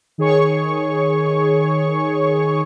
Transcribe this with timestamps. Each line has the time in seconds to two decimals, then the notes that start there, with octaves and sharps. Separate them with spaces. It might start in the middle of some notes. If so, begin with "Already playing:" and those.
0.18 D#3 G#4 C#5 C#6